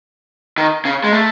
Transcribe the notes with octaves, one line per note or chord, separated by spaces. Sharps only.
D#3
C#3
G#3
A3